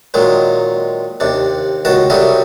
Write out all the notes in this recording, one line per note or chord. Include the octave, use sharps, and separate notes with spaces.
A#2 D#3 F#3 G#3
D#2 C3 D4
C#2 D#3 F#4 A5
C2 D3 F#3 G3 G#4 E5